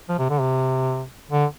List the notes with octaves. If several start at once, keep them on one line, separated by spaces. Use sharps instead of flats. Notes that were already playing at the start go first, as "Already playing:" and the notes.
F3
C3
D3
C3
D3